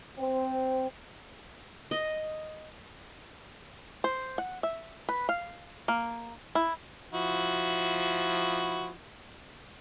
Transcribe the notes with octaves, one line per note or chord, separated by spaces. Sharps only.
C4
D#5
C5
F#5
E5
B4
F5
A#3
E4
F3 E4 F#4